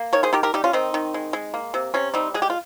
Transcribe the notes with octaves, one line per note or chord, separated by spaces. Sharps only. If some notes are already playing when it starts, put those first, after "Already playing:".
Already playing: A#3
D#3 A#4 C#5
G#4 C5
D#3 G4 A#4
G4 A#4
G3 D#4 G4
C#4 F4
D#3 C4 D#4
D#3
G#3
G#3
A#3
C3
C3 C#4
G3 C4 D#4
G#3 G#4
G4
F4